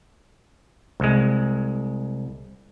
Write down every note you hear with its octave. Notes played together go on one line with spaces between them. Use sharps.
C2 G#3